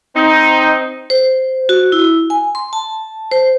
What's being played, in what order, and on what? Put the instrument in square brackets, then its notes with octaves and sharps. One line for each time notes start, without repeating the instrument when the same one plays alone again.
[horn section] C4 D#4
[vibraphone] C5
F#4
E4
G#5
C6
A5
C5